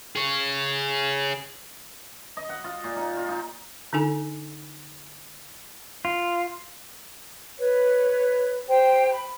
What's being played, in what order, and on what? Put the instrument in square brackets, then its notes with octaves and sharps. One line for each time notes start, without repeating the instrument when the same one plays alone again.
[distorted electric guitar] G#4 C#5
[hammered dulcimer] D#5
F#5
F4
A#2
D#4
F4
D#4
[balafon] D3 D4 D#4 A4 G#5
[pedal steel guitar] F4
[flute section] B4 C#5
G4 C5 G5
B5